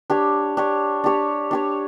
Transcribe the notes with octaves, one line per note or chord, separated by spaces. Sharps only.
D4 G4 C#5
D4 G4 C#5
D4 G4 C#5
D4 G4 C#5